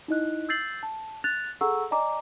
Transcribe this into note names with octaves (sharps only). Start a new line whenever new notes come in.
D#4 E4 D#5 F#6
E6 G6 A6 C7 F#7
A5
F#6 A6 F7
G#4 A4 F#5 A#5 C#6 E6
D5 D#5 G#5 A#5 D6